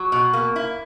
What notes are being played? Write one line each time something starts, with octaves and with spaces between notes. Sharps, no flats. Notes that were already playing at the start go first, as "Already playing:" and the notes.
Already playing: F#3
B2
A#3
E4